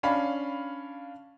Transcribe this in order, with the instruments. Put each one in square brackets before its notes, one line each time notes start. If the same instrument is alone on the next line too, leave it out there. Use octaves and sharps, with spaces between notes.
[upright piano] C#4 D4 F5 B5